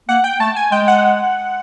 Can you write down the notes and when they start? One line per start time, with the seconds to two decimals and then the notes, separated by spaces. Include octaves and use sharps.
0.09 A#3 F#5
0.24 G5
0.40 A3 A5
0.56 G#5
0.71 G#3 G5
0.88 F#5